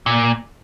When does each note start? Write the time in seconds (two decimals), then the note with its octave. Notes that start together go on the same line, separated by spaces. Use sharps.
0.06 A#2